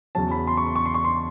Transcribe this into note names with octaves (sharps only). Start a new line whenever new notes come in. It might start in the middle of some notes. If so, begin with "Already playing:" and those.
E2 C#3 F#3 A5
B5
C6
C#6
C6
C#6
C6
C#6
C6